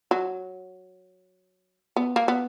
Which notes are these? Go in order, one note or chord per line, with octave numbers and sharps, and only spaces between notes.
F#3
B3
A#3
B3